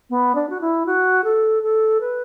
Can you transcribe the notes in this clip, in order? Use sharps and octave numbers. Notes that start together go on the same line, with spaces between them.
B3
D4
F#4
E4
F#4
A4
A4
B4